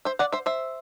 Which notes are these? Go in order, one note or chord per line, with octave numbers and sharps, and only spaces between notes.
C5 E5
D5 F#5
C5 E5
C5 E5